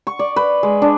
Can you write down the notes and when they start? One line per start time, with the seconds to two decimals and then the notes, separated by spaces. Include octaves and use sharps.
0.07 C#6
0.19 D5
0.36 B4
0.63 G#3
0.82 D4